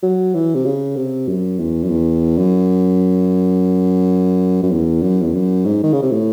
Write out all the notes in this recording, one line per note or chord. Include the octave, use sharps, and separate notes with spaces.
F#3
E3
C3
C#3
C3
F#2
E2
F#2
E2
F#2
F#2
E2
F#2
E2
F#2
G#2
D#3
C#3
C3
A2